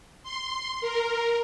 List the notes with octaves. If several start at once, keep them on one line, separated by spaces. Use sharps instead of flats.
C6
A#4